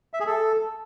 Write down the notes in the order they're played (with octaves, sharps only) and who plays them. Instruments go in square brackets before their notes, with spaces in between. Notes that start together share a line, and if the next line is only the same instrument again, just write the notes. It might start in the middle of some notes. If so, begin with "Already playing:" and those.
[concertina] E5
G#4
A4